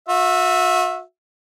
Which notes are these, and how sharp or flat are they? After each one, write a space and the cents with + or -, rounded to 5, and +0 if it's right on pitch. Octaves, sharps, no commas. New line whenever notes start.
F#4 -40 E5 +0